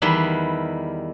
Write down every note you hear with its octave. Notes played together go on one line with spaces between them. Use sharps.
E2 D#3 G3 E4 B4 C6